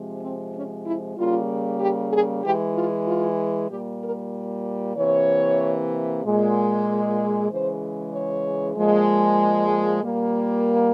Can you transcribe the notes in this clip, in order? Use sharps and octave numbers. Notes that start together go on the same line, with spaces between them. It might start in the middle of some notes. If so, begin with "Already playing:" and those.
Already playing: C3 F3 G#3
C4
C#4
E4
C#3 G3 A#3 F4
G4
G#4
E3 G#3 G4
F4
F4
A#2 G3 A#3 G4
A#4
C3 E3 A#3 C#5
A#2 G#3
C#3 E3 G#3 C5
C#5
A#2 F3 G#3
A#2 G3 A#3